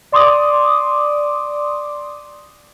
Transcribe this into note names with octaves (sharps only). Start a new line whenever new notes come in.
D5 C6 D6 D#6